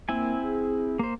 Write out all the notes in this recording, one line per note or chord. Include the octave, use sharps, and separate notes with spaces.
A#3 C4 E4 G#5
G#4
A#3 C5